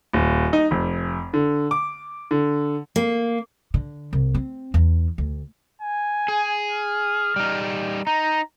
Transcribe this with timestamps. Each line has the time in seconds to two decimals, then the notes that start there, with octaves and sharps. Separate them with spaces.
0.13 D#1
0.53 D#4
0.71 F1
1.34 D3
1.71 D6
2.31 D3
2.96 A#3
3.74 D3
4.13 C2
4.34 C4
4.74 E2
5.18 D2
5.82 G#5
6.28 G#4
6.70 F6
7.36 G3 D#4
8.07 D#4 A#5